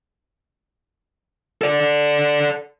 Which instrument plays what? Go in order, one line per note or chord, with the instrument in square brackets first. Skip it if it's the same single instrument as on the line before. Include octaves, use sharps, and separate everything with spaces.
[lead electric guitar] A4 D5